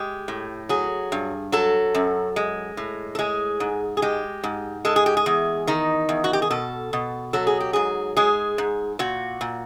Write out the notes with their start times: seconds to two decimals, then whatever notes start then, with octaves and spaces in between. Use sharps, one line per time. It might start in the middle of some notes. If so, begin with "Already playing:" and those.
Already playing: G#3 G4
0.28 A2
0.69 F#3 G#4
1.12 G2
1.52 F#3 A4
1.95 F#2
2.36 G#3
2.77 A2
3.15 A4
3.19 G#3 G#4
3.60 G#2
3.97 G#4
4.02 G#3 G4
4.43 G#2
4.85 G#3 A4
4.96 G#4
5.06 G4
5.17 G#4
5.26 E2
5.67 D#3 D#4
6.09 E2
6.24 F#4
6.33 G4
6.42 G#4
6.50 B2 A4
6.93 B2
7.33 F#3 A4
7.47 G#4
7.60 G4
7.73 G#2 G#4
8.17 G#3 G#4
8.58 G#2
8.99 A#2 F#4
9.41 A#2